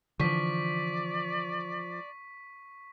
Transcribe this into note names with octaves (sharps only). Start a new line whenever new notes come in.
D3 E3 F3 D5 C#6 B6